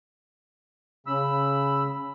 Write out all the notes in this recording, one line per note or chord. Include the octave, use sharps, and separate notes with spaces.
C#3 B5 E6